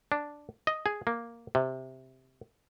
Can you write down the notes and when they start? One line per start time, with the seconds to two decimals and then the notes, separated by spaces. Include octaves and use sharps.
0.12 D4
0.67 D#5
0.86 G#4
1.07 A#3
1.55 C3